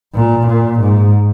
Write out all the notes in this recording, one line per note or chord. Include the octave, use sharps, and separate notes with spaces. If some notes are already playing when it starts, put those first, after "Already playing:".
A#2
A#2
G#2